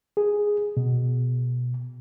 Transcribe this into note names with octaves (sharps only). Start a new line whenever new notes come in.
G#4
B2